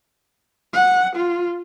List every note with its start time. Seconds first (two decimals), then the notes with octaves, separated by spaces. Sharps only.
0.73 F#5
1.16 F4